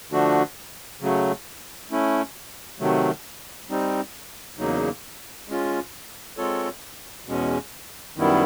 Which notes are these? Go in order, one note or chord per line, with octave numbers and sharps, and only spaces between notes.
D3 F3 A3 D4 F#4
C#3 F#3 A3
A3 C#4 E4
C3 D#3 F#3 A3
G3 C4 D#4
E2 C#3 F#3 A#3 D#4
G#3 C#4 F4
G#3 C4 F4 A4 C#5
E2 B2 G#3 C#4
F#2 D#3 G3 B3 E4